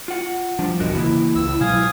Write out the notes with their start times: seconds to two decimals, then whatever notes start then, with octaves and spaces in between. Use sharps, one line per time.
0.08 F4 F#5
0.59 F3 G3 D4
0.80 G#1 E2 B2 F#4 A#4 D#5
0.95 C#3 E3 A#3 E4
1.36 C#2 E6
1.61 B2 F#3 G#3 F5 G#5 D#6